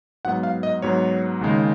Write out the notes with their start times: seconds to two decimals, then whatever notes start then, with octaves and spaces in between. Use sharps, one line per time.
0.25 G#2 F#3 B3 F#5
0.43 F5
0.63 D#5
0.82 G#2 F#3 B3 C#5
1.41 D#2 C#3 G#3 D#4